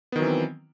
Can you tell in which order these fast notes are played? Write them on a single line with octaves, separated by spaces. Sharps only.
B3 D#3 F#3 E3 C4